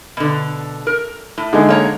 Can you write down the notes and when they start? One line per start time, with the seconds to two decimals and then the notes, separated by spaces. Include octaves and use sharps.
0.17 B2 D3
0.87 A#4
1.38 A2
1.53 D3 G#3 D#4
1.69 A#3 C#5 A#5